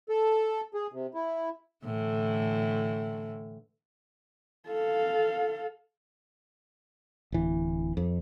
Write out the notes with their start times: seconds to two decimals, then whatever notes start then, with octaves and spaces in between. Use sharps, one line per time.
0.09 A4
0.74 G#4
0.93 C3
1.14 E4
1.85 A2 D3 E3
4.68 A4 F5
7.32 D1 E3
7.97 F2